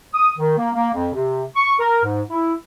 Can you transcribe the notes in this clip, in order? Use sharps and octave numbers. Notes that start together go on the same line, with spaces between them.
D#6
D#3
A#3
A#3
F2
C3
C#6
A#4
G#2
E4